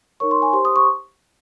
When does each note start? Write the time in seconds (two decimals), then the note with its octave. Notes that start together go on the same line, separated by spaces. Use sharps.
0.20 D#4 A#4 C#5 C#6
0.31 C6
0.42 G#5
0.53 G4 C5 C6
0.65 D#6
0.76 C#6